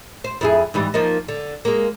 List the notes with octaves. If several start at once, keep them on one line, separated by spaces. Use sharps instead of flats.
C5
F2 E4 G#4
G#2 E3 G3
F3 A#3 D#4
D3
G#3 A#3